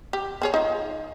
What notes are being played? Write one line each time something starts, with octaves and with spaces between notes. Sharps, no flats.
G4
C4 G#4 C#5
D#4 F4